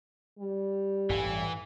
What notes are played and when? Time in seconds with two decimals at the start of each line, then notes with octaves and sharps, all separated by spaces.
0.39 G3
1.10 A1 G2 E3